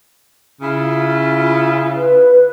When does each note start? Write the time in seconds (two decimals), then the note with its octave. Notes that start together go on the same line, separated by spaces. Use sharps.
0.61 C#3 E4 F4
1.96 B4